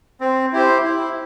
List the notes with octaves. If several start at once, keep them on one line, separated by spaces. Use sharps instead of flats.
C4
E4 G4 C5
E4